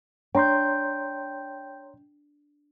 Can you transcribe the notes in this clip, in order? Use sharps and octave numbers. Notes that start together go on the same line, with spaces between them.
D4 C#5 G5 A#5 C6 G6